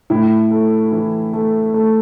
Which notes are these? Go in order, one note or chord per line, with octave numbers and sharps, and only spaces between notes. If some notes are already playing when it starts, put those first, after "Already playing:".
A2 E4
A3
E3
A3
A3